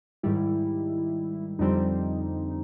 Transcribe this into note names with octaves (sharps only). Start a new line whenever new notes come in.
G#2 D#3 G3 E4
F2 D3 G3 C4 D#4